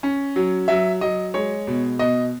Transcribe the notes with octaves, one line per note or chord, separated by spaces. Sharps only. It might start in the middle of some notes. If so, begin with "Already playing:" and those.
C#4
F#3
F#3 E5
F#3 D#5
G#3 C#5
B2
B2 D#5